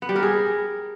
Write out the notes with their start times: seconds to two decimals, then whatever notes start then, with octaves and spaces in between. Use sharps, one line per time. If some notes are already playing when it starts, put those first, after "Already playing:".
0.02 B3
0.09 G3
0.16 A#4
0.23 G#4